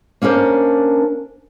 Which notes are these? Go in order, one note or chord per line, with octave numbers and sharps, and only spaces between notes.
A#3 C#4 D4 A#4 C5